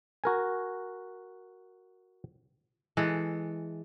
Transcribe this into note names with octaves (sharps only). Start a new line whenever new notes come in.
F#4 A#4 G#5
E3 G#3 A4